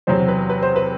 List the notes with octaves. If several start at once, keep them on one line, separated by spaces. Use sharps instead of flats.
E2 C3 F#3 C5
B4
B4
C5
B4